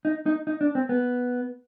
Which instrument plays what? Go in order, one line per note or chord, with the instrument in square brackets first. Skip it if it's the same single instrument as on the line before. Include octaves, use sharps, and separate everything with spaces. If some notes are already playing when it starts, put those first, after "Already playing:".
[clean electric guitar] D#4
D#4
D#4
D4
C4
B3